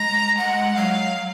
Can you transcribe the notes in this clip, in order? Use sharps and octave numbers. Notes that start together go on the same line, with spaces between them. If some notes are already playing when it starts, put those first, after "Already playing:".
Already playing: G#3 A#5
G#3 F#5
F#3 F5
F#3